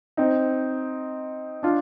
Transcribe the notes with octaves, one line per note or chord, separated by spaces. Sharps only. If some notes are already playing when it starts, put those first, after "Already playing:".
C4 D#4
D4 F4